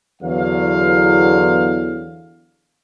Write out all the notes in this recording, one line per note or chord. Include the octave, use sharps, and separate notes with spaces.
E2 D3 F#3 F5